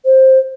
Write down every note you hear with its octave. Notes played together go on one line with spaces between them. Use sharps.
C5